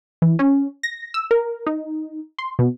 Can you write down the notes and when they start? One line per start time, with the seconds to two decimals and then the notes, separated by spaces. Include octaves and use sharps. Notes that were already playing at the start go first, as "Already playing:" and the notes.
0.22 E3
0.39 C#4
0.83 A#6
1.14 E6
1.31 A#4
1.67 D#4
2.39 C6
2.59 B2